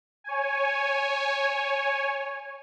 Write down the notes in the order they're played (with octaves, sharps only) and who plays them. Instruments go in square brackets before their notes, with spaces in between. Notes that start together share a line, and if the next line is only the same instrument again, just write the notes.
[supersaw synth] C#5 G#5